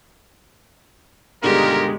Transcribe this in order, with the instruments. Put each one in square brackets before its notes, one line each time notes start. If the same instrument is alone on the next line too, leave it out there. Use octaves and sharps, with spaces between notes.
[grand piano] G2 B2 D3 [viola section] D#3 G#3 [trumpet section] F4 A#4 [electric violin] G4